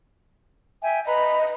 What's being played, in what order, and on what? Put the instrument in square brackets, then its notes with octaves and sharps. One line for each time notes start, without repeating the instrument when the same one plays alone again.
[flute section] E5 G5 G#5
[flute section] B4 A#5 B5 [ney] D#5